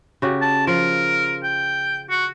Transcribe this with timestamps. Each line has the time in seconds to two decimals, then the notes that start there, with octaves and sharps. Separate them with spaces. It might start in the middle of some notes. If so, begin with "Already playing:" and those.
0.22 C#3 F#4 G4
0.42 A5
0.67 F3 A#4
1.44 G5
2.10 F#4